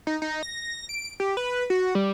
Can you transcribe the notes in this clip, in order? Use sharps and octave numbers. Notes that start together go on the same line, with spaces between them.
D#4
D#4
A#6
D7
G4
B4
F#4
G3